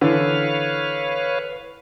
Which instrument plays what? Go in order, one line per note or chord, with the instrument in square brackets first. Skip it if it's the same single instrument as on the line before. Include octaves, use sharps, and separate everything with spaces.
[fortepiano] D3 E3 [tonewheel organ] B4 C#5 F5